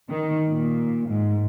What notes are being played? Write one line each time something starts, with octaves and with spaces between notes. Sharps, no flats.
D#3
A#2
G#2